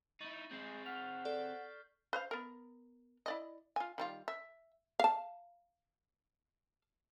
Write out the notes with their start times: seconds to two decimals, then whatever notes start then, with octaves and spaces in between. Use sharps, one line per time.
0.21 D#4 E4 C#6 A6 F#7
0.51 G#3 C4 G#4 G6 C7 F#7
0.86 F#5 F6 B6 F7
1.25 A4 D5
2.13 B4 C5 F5
2.31 B3 A#4
3.26 E4 D5 D#5
3.76 F4 G#5
3.98 D#3 G3 F4
4.28 E5
4.99 F5 A5